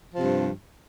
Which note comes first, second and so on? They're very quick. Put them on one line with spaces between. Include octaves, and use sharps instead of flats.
F3 C3 G2